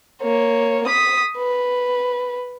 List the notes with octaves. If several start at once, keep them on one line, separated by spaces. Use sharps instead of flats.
A#3 C#5
D#6 B6
B4